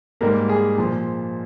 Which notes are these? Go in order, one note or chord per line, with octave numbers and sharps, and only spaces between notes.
G#2 G3 A#3 A#4
G#4
A#2 F3